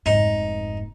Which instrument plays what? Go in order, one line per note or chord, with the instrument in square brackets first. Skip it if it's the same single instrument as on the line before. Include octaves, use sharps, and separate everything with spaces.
[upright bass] F1 G#2 [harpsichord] D#4